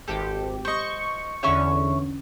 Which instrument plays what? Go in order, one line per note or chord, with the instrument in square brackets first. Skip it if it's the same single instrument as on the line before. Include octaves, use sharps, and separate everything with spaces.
[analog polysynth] G#1 G4 [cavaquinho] A4
[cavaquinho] C5 D#5 [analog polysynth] C#6
[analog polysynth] E2 D3 C#4 [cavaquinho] C#5 E5 C#6